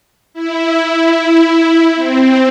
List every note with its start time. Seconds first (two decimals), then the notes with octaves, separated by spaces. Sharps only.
0.34 E4
1.95 C4